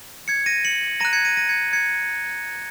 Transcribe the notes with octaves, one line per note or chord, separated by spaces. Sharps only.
G#6 C#7
A#6 D#7
C#7 F#7
A#5 F#6 A#6 D#7
G#6 C#7
A#6 D#7
A#6 D#7
G#6 C#7
G#6 C#7